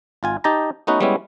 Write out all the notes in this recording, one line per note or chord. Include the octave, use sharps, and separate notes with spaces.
G#1 F4 G#5
D#4 G4 A5 A#5
A3 B3 C#4 D#4 F#4 B4
G3 G#3 B3 C#4 E4